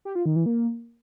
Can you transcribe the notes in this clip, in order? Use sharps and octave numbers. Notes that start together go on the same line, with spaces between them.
G4
F4
D#3
E3
A#3